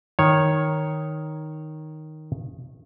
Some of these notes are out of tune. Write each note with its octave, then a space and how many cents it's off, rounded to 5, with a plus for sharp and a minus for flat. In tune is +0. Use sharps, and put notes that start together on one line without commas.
D#3 +0 C#5 +0